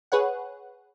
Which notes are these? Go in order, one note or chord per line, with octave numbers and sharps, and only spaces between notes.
G#4 B4 C#5 F#5